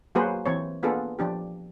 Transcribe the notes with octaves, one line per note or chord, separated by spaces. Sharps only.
F#3 A#3 F#4 G#4 B4 C5
E3 C4 C#5
A#3 B3 D4 F4 G#4 A4
F3 D4 G4